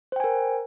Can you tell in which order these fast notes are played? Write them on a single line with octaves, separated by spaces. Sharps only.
C5 G5 G#5 A#4